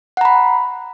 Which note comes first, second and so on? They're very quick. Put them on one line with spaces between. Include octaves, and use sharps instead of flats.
F#5 A#5 B5